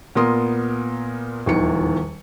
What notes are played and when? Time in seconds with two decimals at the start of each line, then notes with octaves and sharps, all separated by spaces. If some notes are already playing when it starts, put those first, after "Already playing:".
0.15 A#2 B3 A#4 C6 D#6
1.46 D#1 E2 D#3 F3 C#7